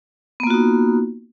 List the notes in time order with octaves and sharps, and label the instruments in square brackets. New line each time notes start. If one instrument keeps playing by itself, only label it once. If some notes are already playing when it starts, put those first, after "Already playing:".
[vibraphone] B3
A#3
F4
F#4
D#4